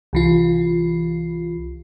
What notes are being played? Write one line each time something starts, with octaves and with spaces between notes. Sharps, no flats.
C2 E3 F4